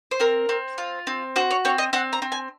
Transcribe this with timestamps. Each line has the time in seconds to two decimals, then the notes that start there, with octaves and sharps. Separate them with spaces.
0.11 C5
0.20 C4 A#4
0.49 C4
0.78 F4
1.07 C4
1.36 F#4 C5
1.51 C#5
1.65 C4 C#5
1.78 D#5
1.93 C4 F#5
2.13 A#5
2.22 C4
2.32 G#5